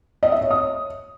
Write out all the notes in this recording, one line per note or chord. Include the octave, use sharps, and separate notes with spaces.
D#5
E5
C#5
D#6